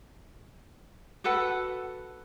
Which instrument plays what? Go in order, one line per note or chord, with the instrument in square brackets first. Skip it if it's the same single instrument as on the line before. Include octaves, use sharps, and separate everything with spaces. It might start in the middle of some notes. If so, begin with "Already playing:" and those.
[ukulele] F#4 A4 B4 F#5